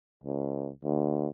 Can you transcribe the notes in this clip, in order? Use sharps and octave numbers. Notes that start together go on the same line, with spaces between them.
C#2
D2